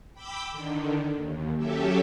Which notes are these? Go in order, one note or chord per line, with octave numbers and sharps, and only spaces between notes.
G5 B5 D6 E6 G6
D3 D#3
D#2
F#3 C#4 G4 A4 E5